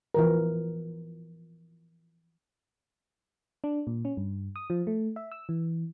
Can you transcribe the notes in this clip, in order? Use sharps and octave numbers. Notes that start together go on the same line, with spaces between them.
E3 F3 A#4
D4
A#2
C#4
G2
D#6
F3
A3
E5
E6
E3